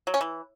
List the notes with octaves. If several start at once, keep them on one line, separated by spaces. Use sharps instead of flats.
F#3
C#4
E3